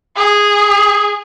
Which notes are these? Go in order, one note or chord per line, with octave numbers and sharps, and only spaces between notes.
G#4